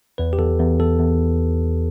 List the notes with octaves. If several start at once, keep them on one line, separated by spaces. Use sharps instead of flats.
E2 B4
G4
E2 A4
E2
E2 A4
E2